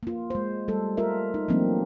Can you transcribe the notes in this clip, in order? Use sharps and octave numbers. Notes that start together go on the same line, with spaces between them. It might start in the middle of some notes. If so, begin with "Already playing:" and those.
A#3 F4
G#3 C5
G3 A3 A4
F4 A#4 E5
D#4
E3 F#3 A3 A#3 C4 D4